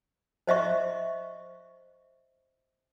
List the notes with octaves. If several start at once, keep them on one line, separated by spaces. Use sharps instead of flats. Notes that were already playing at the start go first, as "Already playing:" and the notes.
C5 D#5 E5 C#6